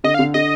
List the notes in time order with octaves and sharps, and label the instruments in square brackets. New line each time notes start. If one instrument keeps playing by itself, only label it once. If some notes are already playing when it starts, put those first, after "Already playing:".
[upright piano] D3 [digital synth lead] D#5
[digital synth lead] F5
[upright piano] D3
[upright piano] D3 [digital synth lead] D#5